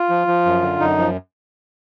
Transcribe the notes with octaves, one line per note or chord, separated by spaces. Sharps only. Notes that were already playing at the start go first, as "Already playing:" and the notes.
Already playing: F4
F3
F3
F#2
D3
F#2 D#4
F3